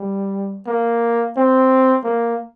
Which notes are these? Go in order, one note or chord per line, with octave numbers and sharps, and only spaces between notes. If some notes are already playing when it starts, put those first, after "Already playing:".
Already playing: G3
A#3
C4
A#3